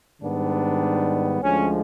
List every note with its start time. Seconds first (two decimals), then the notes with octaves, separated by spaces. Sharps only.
0.21 G#2 D#3 G3 B3 D4
1.41 D2 D3 F3 G#3 C#4